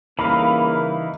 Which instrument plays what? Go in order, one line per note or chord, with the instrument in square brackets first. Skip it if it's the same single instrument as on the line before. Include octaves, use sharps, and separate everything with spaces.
[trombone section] C#3 G3 A#3 [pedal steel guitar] E3 D#4 F5 [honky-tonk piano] B5